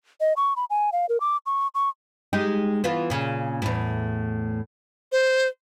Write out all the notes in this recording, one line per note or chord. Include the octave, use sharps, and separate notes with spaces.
D#5
C#6
B5
G#5
F5
A#4
D6
C#6
C#6
G#3 D#4 G4
E3 B3 F4
A#2 C#3
E2 A2
C5